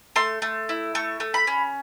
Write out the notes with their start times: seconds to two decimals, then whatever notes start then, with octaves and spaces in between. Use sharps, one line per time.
0.16 A3 C6
0.42 A3
0.69 E4
0.95 A3 C#6
1.20 A3
1.34 B5
1.47 C#4